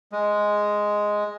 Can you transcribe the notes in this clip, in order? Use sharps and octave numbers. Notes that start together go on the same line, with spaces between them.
G#3